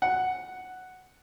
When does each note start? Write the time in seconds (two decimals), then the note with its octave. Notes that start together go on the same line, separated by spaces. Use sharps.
0.02 F#5